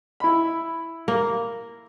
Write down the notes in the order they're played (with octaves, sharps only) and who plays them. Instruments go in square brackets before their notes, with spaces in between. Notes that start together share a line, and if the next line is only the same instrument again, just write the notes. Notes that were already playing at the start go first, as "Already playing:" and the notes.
[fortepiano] E4 B5
[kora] A#3